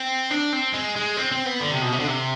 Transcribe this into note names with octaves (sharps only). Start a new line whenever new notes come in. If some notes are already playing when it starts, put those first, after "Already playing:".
Already playing: C4
D4
C4
G#3
G#3
C4
C4
B3
D3
C3
B2
C3
D3
C3